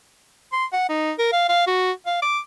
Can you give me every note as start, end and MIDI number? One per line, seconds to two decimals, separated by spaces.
0.53 0.65 84
0.73 0.88 78
0.89 1.12 63
1.19 1.29 70
1.33 1.47 77
1.49 1.64 77
1.67 1.92 66
2.06 2.19 77
2.23 2.39 86